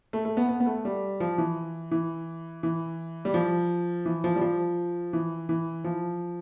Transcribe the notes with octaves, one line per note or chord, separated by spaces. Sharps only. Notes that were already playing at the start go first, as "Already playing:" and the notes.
A3
A3
B3
B3
B3
A3
G3
F3
E3
E3
E3
G3
F3
E3
F3
G3
F3
E3
E3
F3